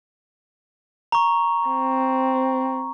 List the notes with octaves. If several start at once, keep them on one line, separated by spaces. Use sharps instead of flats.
A#5 C#6
C4